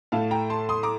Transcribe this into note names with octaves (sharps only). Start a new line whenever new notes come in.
A2 A3 F5 A5
G5 A#5
A5 C6
C6 D#6
A#5 D6